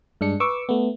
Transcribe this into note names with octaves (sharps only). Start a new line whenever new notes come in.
G2 G#3 D4 C#7
B4 C#6 D6 E6
A3 B3